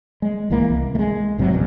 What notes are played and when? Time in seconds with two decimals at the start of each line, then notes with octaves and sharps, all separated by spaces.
0.22 G#3
0.50 D1 C2 E3 A#3
0.69 C2
0.95 G#3 A3
1.38 G#1 C3 E3 F#3
1.51 E1 A#1 E2